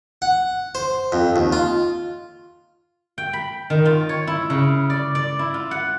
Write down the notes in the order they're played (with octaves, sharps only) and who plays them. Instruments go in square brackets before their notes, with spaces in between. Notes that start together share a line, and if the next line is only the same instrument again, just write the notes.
[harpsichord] F#5
C5
F2
D#2
F4
[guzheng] G5
B5
D#3
F4
C#5
E4
C#3
D5
D5
E4
F4
F#5